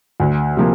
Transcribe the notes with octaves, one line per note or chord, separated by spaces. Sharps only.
D2
C3 F3 A#3